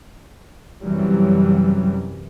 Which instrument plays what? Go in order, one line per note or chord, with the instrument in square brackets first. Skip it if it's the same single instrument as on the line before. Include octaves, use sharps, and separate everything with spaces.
[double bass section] F#2 C3 E3 F#3 G3